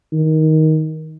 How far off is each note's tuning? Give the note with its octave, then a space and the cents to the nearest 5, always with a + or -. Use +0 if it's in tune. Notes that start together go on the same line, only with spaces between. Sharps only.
D#3 +15